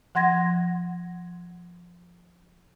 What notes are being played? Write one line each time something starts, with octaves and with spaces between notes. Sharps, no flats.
F3 F#5 C6 G#6 A#6